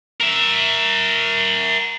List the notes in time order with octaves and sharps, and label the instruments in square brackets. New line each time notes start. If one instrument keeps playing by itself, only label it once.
[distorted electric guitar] A#4 E5